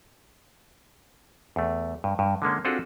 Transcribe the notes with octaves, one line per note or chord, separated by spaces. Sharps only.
E2 A3
G2
G2
D3 G#3 A#3 C#4
C4 D4 F4 F#4 G#4 A4